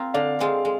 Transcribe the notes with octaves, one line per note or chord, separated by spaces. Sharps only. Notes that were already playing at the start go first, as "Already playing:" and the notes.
Already playing: C4 F4 A#4
D3 D5 F5
G#3 C4 F4 A#4
G#3